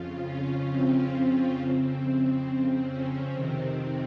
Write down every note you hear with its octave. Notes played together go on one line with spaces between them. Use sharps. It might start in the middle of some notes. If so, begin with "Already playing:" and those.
Already playing: F2 C#3 F4
C#4
C4
F2 C#3
C4
C#4
F2 C3 D#3 C4